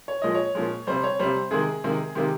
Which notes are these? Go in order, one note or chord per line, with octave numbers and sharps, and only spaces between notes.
C#5
A#2 F3 G#3 D#5
C#5
A#2 F3 G#3
C3 G3 C5
C#5
C3 G3 C5
C3 D#3 G#3 G#4
C3 D#3 G#3
C3 D#3 G#3 G4